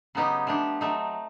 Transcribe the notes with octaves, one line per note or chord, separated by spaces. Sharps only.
C#3 F#3 B3 D#4 G4
F3 A3 D4 G4
F#3 A3 C4 D#4